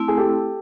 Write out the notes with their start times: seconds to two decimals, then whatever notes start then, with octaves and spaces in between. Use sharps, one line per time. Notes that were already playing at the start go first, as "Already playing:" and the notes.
Already playing: A3 C4 E4
0.08 G#4
0.17 G4 A4